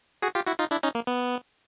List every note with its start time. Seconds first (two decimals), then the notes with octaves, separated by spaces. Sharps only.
0.22 F#4 G#4
0.35 F4 G4
0.47 E4 F#4
0.59 D#4 F4
0.71 D4 E4
0.83 C#4 D#4
0.95 A#3
1.07 B3